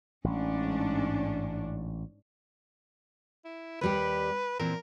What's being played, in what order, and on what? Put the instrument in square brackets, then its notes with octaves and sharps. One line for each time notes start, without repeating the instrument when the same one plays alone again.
[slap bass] A1 [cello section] G#2 C#4 D4
[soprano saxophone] E4
[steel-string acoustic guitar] D#2 G3 G4 [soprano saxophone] B4
[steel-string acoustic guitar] A#2 E3 C4 [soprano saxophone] A#4